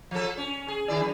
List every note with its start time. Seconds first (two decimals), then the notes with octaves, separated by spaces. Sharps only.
0.11 F3 A4
0.37 C#4
0.68 G#4
0.88 D#3 E4 D5
1.00 F#2